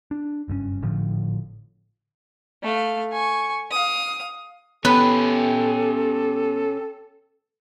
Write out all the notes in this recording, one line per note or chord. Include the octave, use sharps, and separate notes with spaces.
D4
F#1 G2 B2 C#4
G#1 A2 D3 F3
A3 F5
G#5 C#6
F5 D#6
B3 C#4 G4 A4 B4